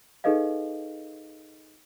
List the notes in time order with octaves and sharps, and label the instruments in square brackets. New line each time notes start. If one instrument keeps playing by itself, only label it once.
[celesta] D#4 G#4 A4 B4 D#5 F5